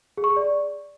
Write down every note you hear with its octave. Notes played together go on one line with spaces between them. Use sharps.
G#4
C#6
G#4
D5